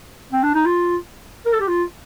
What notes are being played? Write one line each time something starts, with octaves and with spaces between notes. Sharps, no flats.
C4
D4
D#4
F4
A#4
A4
G4
F4